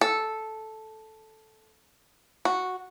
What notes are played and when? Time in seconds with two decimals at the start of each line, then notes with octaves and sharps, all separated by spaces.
0.01 A4
2.45 F#4